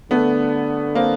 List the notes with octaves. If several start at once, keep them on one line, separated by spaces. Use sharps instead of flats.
D3 A3 B3
A#3 C4